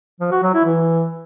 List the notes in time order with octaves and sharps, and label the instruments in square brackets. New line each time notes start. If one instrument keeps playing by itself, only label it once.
[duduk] F3
F#4
F#3
E4
E3